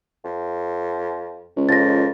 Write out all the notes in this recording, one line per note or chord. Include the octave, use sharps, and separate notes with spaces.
F2
C#2
F2 A6 A#6